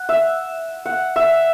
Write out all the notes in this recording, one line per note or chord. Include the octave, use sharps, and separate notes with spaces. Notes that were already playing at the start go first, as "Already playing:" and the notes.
Already playing: F#5
E5
F#5
E5